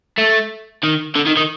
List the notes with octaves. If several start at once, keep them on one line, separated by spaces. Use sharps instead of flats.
A3
D#3
D3
D#3
D#3